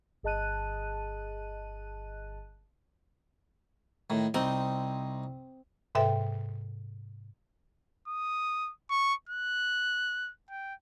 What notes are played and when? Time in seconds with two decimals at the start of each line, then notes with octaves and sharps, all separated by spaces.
0.23 G1 G#4 D#5 A5 F#6 D#7
4.10 A2 D#3
4.34 C2 C4 D#4 D#5
5.95 G#2 C3 A4 B4 E5 G5
8.08 D#6
8.90 C#6
9.29 F#6
10.50 G5